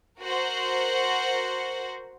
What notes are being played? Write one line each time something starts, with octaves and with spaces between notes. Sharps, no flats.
F#4 A#4 C5 F#5